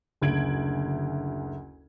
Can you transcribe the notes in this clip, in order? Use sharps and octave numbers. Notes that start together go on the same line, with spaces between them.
F#1 D2 G#6 D7 F#7